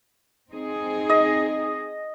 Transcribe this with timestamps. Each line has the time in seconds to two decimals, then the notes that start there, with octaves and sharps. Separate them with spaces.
0.50 C4 D#4 G#4
1.09 D#5